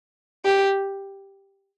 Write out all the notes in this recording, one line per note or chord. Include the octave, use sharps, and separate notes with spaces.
G4